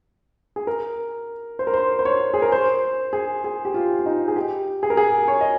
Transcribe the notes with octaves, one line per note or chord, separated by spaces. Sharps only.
G#4
A#4
C5
A#4
C5
C5
C#5
G#4
A#4
C5
G#4
G#4
G4
F4
F4
D#4
G#4
G4
G#4
A#4
G#4
C#5
D#5